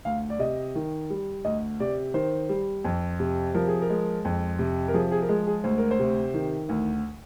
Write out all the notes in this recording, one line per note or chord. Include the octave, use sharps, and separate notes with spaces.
D2 F5
D5
C3 D#5
D#3
G3
D2 D#5
C3 D5
D#3 C5
G3
F2
C3
F3 A#4
G#4
A#4
G#3
F2
C3
A#4
F3 G#4
G#4
A#4
G#3 G#4
G#4
D2 C5
A#4
C5
C3
D#3
D2